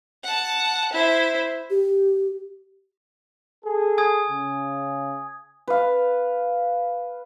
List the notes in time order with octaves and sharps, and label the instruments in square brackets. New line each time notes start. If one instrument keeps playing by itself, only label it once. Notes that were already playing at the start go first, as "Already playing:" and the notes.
[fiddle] F#5 A5
E4 C5
[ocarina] G4
[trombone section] G#4 A4
[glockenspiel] G#5 D#6 G#6
[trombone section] C#3
[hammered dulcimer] B4 F5